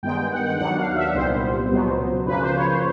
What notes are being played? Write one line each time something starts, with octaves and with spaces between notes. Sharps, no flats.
G2 D#3 G#3 B3 G5
G5
F#5
F#5
D#2 D#3 F#3 B3 D4 F#5
F5
E5
C2 A#2 G3 B3 C5
C#2 B2 F#3 B3
F#2 C#3 F3 A#3 B4
C5
C#5
C5